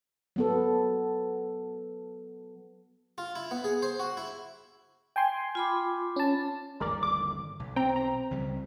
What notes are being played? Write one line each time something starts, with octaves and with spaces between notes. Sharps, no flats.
F#3 B3 A4
F4
E4
B3
G#4
C5
F#4
E4
G5 G#5 C6
F4 B5 D6
C#4 A5
G1 D#2 D3 G#3 A#4 D5
D6
B1
C4 G5 A#5
A#5
C#2 C#3 G3